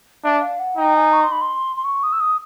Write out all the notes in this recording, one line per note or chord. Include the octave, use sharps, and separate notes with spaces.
D4 E5
F5
F#5
D#4 G5
G#5
C#6
C6
B5
C6
C6
C#6
D#6
E6
D#6